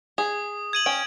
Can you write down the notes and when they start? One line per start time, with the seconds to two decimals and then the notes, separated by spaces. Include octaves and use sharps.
0.18 G#4 D#6
0.73 G#6 D#7 F#7
0.86 C#4 G5 D7